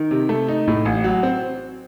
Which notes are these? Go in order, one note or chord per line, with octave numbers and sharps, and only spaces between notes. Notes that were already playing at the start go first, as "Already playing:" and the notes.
Already playing: D#3
C3
A3
D#4
A2
A1
F#3
C4